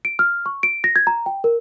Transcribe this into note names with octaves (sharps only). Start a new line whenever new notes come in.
D7
F6
C#6
D7
A#6
G#6
A#5
G5
A#4